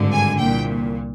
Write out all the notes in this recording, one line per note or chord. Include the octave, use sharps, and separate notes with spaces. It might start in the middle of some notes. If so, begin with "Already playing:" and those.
Already playing: G#1 G2 D3
G#5
C2 A#2 G5